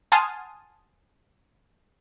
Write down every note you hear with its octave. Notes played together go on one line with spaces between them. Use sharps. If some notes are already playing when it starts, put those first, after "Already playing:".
F#5 G#5 A5 C6 D#6 F6